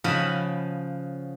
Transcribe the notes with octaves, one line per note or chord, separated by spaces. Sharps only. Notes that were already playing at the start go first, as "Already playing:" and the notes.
C#3 F3 F#4 D#5 B5